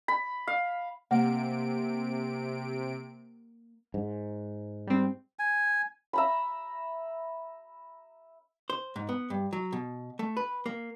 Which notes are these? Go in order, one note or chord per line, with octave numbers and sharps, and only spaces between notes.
B5
F5
C3 A#3 F#5 D7
G#2
G3 C4
G#5
E5 A#5 B5
C5
G#2
B3
G2
F#3
B2
A3
B4
A#3